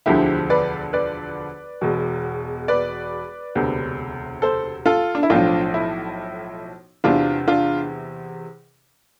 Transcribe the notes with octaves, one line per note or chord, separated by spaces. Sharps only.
E1 D2 D3 F3 E4 G4
B4 D5
B4 D5
E1 E2 B2
B4 D5
E1 D2 C3
A4 C5
F4 A4
D4
E4
B1 A2 F3 D4 F4
E4
E2 C3 E3 D4 F4
D4 F4